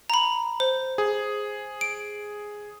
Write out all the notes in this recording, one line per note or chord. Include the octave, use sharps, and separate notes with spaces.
A#5 B5
C5
G#4
D7